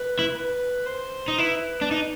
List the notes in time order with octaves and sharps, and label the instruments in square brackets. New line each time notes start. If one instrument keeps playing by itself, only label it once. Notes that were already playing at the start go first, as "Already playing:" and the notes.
Already playing: [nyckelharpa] B4
[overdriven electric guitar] E4
[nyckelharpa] B4
C5
[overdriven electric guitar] D#4
[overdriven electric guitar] E4 [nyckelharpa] B4
[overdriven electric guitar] D4
D#4